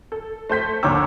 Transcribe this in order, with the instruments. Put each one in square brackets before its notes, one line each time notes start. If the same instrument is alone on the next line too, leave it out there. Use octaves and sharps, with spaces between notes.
[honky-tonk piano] A4
A3 C5 G6 B6
D#2 D3 C#5 A#5 D6 E6